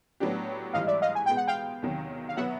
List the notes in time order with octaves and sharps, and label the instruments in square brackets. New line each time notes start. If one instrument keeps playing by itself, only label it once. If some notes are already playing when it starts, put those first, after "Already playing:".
[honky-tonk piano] A2 F#3 B3 D4 G4
[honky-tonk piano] G#2 E3 G3 [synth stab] D#5 F5
[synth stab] D5 E5
D#5 F5
G#5
[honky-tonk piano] B2 G#3 B3 [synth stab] G5
[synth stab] F#5
F5 G5
[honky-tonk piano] E2 C3 D#3 F#3
[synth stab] F5
[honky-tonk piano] B2 F#3 B3 [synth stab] E5 F#5